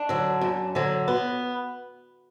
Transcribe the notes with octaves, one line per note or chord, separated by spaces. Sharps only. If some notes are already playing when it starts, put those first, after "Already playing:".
Already playing: D4
D3 F#3
F#2
D3 F#3
B3